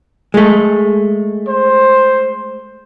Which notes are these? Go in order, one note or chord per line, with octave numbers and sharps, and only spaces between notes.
G#3 A3
C5